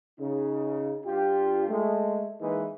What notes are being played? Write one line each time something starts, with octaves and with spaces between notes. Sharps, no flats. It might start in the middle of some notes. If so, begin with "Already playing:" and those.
C#3 D#4
G2 F4 G4
G#3 A3
E3 G#3 A#3 D#4 G#4 B4